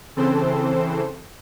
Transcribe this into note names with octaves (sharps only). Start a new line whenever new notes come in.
C#3 E3 C4 A4 C5